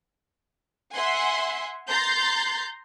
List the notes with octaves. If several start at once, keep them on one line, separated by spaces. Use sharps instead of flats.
E5 F#5 G#5 C6
A#5 C6 G6 A6 C7